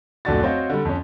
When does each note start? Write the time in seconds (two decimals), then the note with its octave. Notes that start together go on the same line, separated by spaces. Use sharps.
0.25 D1 F2 A3 D4 F#4 A6
0.43 C4 F#4 C5 C#5 D#5 F5
0.70 D3 G3
0.85 F2 C#4